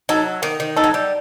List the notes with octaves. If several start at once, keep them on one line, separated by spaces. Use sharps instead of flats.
F#3 D#4 A4
D#3 A#3
D#3
D#4 A4
F#3
G3